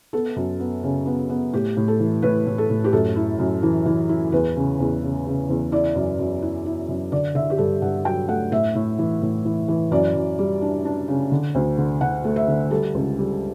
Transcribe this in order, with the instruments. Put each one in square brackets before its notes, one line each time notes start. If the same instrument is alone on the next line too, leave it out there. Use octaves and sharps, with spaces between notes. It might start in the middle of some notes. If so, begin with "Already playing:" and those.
[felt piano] B3 A4
F#2
B3
C#3
B3
B3
A2 G4
A2
A4
E3
A2 B4
A2
A4
A2
G4
F#2 A4
E4
F#2
E3
E3
E4
E2 B4
C#3
E2
C#3
C#3
E2
E4 D5
F#2
F#2
E4
E4
F#2
D3 D5
D3 E5
G4
G2 A4
G2 F#5
F#3 G5
A3 F#5
A2 E5
A2
E3
A2
E3
E3
F#2 D5
F#2
G3
D4
D4
C#3
D3
D2
D3
D3 F#5
A3
E5
D3
G3 A4
C#2
G3